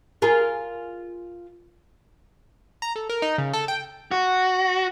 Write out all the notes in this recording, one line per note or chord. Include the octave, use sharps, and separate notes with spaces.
F4 G#4 A#4
A#5
A4
A#4
D#4
C#3
A4
G5
F#4